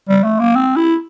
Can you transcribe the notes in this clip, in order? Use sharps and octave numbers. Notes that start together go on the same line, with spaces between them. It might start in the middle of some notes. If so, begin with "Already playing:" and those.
G3
A3
A#3
C4
E4